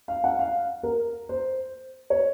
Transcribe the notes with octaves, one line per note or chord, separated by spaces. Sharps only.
F5
F#5
F5
A#4
C5
C#5